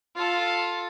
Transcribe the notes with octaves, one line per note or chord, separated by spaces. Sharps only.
F4 A4